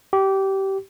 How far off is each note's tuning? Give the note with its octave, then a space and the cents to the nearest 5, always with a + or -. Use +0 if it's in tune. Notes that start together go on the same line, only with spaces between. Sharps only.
G4 -20